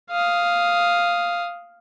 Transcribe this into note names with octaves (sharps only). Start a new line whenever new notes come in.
F5 D#6